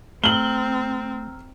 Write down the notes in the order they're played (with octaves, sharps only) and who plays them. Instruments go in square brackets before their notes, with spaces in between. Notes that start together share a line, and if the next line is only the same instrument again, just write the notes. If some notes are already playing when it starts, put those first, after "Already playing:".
[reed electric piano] A3 [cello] C4 [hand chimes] A#5 E6 F6 [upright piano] F#7 G7